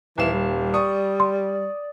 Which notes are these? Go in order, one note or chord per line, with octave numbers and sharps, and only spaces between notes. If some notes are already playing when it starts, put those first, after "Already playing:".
D#1 E3 F5 E7
G3
D5 C#6 D#6
C6